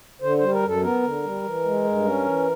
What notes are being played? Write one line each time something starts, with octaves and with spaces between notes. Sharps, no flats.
D3 C5
G3 C5
A#4
F#2
A4
B3 A#4
D3
G3
E3
G#3
G2
C#4
E3